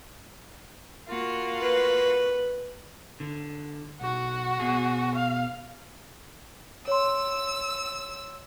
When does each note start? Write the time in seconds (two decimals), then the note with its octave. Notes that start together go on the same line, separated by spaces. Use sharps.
1.08 A#3 F4 F#4
1.61 B4
3.20 D3
4.01 B1 F#4
4.60 B2 G#4
5.15 F5
6.88 C#5 C6 E6